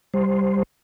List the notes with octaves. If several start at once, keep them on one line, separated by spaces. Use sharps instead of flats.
G3 C5